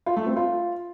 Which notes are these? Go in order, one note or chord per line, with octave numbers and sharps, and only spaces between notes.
F4
A3
C4
F4